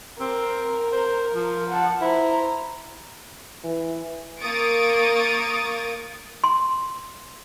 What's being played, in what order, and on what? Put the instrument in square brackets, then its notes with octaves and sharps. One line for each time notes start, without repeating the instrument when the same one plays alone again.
[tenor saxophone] C4 [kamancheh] A#4
[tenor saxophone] C5
F3
[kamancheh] F#5 A5
[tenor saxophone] E4 [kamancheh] C5 A#5
[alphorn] E3
[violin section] A#3 C#6 D#6 A6 D7
[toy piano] C6